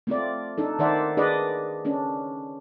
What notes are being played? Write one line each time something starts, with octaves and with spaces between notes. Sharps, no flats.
A3 C4 F4 D5
D4 D#4 A4
D#3 C5 D5 E5 F#5
D4 G#4 B4 D5 D#5
C#4 D4